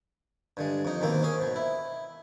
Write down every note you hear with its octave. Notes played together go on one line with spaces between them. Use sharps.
G2 D3 G#3
F2 D#4
G#2 B2 D#3 A#3 C4
C#4 G#4
G#2 B2
E4